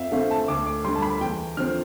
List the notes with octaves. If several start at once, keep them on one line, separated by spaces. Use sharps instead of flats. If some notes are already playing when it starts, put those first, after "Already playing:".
Already playing: F2 E5 F5
D3 A3 C4 F5
A5
D2 D6
D6
D3 G3 C6
A5
B5
E2 G5
D3 F3 C4 F6